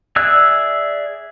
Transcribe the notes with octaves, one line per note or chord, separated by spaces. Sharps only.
G#4 D5 E5 E6 F#6